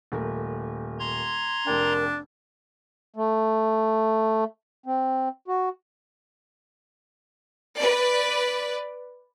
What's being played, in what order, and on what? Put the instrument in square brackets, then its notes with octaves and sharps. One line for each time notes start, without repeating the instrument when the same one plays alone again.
[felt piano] D#1 A3 A#4
[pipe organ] A#5 C6 G#6
[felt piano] F1 G5 [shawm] D4 [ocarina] A#4
[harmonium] A3
C4
F#4
[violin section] B4 D5